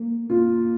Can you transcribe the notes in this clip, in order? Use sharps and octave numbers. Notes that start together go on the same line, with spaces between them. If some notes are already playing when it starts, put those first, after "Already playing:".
Already playing: A#3
A#3 F4